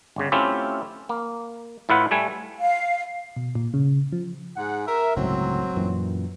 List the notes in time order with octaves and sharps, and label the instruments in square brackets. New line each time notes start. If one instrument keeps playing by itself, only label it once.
[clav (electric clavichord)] G1 C#3
A3 C4 C#4 E4 F4 G4
A#3
A2 E4 F4 B4 F#5
G3 A3 G#5
[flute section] F5
[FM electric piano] B2
A#2
C#3
F3
[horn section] G#2 G#4 F#5
A#4 E5
[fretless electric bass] G1 C#2 A2 [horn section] F#3 C4
[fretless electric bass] F#2 A#2 E3